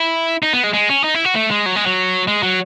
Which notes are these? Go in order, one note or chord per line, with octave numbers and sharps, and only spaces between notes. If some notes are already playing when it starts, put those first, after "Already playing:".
Already playing: E4
D#4
B3
G#3
G#3
C#4
D#4
E4
F#4
A3
G#3
F#3
G#3
F#3
G#3
F#3